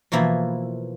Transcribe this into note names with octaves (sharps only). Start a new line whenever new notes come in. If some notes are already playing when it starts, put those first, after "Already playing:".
B2 E3 F3 A#3 E4